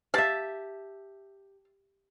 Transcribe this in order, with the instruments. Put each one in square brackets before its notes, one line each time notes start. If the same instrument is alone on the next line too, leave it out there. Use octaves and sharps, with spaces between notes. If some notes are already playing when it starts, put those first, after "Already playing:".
[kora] G4 E5 [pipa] F5 A5